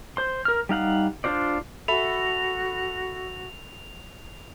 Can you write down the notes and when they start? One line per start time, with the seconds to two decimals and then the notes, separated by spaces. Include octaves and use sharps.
0.17 C5 C6
0.45 A#4 F6
0.69 G3 D#4 F5 F#5
1.24 D4 F4 C5 D5
1.88 F#4 A4 E5 B5 F7